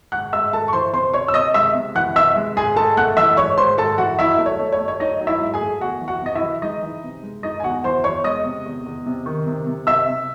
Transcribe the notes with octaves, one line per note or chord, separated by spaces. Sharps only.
G#2 F#5 F#6
G#2 E5 E6
G#2 A4 A5
C#6
E3 C5 C6
C3 C5 C6
C3 C#5 C#6
E6
C3 D#5 D#6
G#3 E5 E6
C3
E3 F#5 F#6
C3 E5 E6
G#3
G#2 G#4 G#5
G#2 A4 A5
A3 F#5 F#6
E3 E5 E6
G#2 C#5 C#6
G#2 C5 C6
G#2 A4 A5
E3 F#4 F#5
F#3 E4 E5
A3
C#5
A3
C#5
A3
C#5
F#3 D#4 D#5
F#3
E4 E5
G#2
G#4 G#5
A3
E2 F#4 F#5
E3
F#4 F#5
C3 D#5
E4 E5
E3
G#3 D#4 D#5
E3
C3
G#3
G#3 D#4 D#5
G#5
E2 F#4 F#5
E3 C5 C6
E2 C#5 C#6
G#3 D#5 D#6
C3
E2
E2
C3
D#3
C3
C3
C3 E5 E6
C3